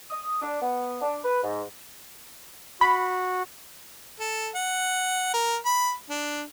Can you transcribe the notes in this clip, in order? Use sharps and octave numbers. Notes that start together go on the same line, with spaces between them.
D#6
D4
B3
D4
B4
G#2
F#4 B5
A4
F#5
A#4
B5
D4